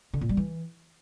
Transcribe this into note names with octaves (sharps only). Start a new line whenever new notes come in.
D3
A#2
G3
E3